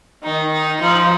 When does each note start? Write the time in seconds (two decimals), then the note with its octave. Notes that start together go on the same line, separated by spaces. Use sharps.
0.23 D#3 D#4
0.52 D#4
0.80 F3 D#4